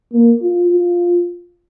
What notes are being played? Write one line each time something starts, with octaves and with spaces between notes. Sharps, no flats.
A#3
F4
F4